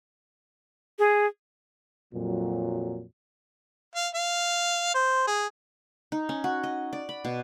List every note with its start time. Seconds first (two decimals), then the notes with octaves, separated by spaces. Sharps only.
0.99 G#4
2.14 F2 A#2 F#3
3.95 F5
4.14 F5
4.95 C5
5.27 G#4
6.12 D#4
6.29 C#4
6.44 F#4
6.63 D#5
6.93 D5
7.09 B5
7.25 B2